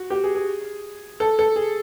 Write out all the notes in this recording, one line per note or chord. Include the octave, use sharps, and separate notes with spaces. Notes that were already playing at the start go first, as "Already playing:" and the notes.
Already playing: F#4
G4
G#4
G#4
A4
A4
G#4